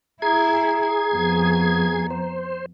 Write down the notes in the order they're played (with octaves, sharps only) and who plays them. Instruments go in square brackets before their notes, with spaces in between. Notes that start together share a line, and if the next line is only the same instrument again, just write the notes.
[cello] E4 [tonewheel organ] G#4 G#6 [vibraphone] A#5
[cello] F2 B3
[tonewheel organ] C5